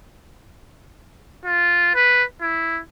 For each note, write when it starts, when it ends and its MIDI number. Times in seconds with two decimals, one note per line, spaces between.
1.45 1.94 65
1.95 2.23 71
2.41 2.81 64